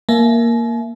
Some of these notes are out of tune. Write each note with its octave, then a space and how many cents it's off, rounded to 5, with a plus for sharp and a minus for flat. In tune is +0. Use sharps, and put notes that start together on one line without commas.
A#3 +0 E5 +20 G#5 +45